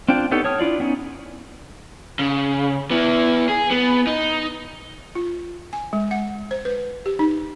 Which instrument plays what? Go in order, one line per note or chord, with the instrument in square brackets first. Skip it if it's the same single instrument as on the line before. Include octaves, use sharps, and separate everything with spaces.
[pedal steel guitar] C4 D4 F4 G5
B3 D#4 G4 A4 C#5
C#5 A5 D#6 F6
D4 E4 F4 D5
B3 C#4 D#4
[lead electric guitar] C#3
B3 E4
G#4
B3
D#4
[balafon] F4
G#5
G#3
F#5
C5
B4
G4
D#4